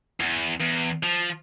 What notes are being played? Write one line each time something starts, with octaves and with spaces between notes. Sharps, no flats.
E2
E2
F3